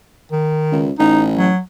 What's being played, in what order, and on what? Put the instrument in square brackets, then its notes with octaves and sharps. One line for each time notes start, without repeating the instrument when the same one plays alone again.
[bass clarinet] D#3
[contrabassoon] C#2
[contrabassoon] A1 [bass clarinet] D#4
[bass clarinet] F#3